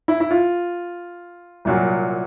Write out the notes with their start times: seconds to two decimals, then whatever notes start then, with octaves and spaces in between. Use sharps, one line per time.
0.08 E4
0.20 E4
0.31 F4
1.65 C2 A#2 F#3